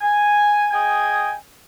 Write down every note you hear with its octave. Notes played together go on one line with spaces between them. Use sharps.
G#5
G#4 D#5 G5 G#5